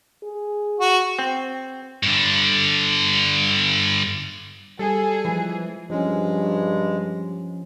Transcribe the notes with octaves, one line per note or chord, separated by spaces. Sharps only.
G#4
F#4
C4
G2 D3
G3 G#4 A4
E3 F3 G#3
G2 F3 G#3 C#4